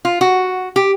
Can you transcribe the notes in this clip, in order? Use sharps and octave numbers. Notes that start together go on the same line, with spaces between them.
F4
F#4
G4